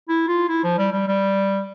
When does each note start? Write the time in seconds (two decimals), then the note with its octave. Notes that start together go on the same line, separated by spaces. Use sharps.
0.09 E4
0.28 F4
0.49 E4
0.64 F3
0.78 G3
0.92 G3
1.08 G3